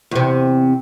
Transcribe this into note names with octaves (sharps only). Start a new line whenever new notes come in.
E2 C3